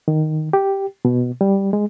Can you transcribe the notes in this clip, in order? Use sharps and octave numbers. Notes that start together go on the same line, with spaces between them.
D#3
G4
B2
G3
G#3